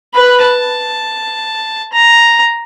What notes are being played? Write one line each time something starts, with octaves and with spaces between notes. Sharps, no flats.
B4 B5
A5
A#5